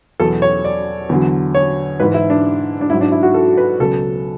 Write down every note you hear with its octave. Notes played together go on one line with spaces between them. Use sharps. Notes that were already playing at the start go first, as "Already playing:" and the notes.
E2 B2 F#3 A4
C#5
D5
E2 D3 F#3
C#5
G#2 E3 B4
E4
D4
D4
G#2 F#3 E4
D4
E4
F#4
A4
B4
C#2 B2 F#3 A4